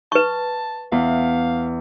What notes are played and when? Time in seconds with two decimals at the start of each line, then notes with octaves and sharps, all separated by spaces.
0.12 B4 A5 C#6
0.92 E2 F5